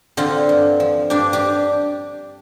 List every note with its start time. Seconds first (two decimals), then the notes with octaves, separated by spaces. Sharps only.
0.17 D3 C4 F4
0.49 G2
0.80 F3
1.10 G2 D4 G4
1.33 D4 G4